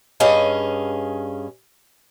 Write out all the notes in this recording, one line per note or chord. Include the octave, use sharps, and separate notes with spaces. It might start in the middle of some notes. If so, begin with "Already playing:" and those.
G2 C#4 G#4 D#5 F5